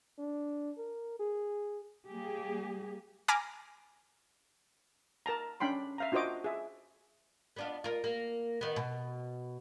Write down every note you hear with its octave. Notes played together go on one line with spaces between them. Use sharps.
D4
A#4
G#4
G3 A#3 G4 G#4
G#5 A#5 B5 D6 F6
A#4 A5 A#5
C#4 D4 G5 B5 C6
E5 F5 A#5
D4 F4 F#4 C5 D#5 D6
G#4 E5
B3 D4 F4
F4 A#4
A#3
D#3 B3
B2